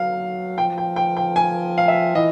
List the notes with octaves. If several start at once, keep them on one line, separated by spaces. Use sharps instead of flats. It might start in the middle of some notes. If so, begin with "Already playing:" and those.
Already playing: F#3 F5
F3 G5
G5
G5
G5
G#5
F5
E5
E3 D#5